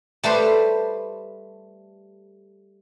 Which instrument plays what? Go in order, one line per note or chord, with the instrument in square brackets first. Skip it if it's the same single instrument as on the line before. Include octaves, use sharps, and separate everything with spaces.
[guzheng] G3 A3 B4 C5